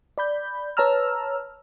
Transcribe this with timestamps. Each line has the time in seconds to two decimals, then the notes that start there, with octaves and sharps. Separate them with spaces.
0.18 D5 B5 G6
0.77 B4 C#5 A5 A#5 E6 F6